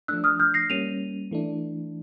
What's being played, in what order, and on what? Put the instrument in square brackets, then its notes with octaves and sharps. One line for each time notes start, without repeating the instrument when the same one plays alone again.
[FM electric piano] F3 A3 D4 [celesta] E6 F#6
[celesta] D#6 F6
F6 G6
A#6 C7
[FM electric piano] G3 A#3 C#4 [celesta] D#7 F7
[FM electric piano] E3 A3 D4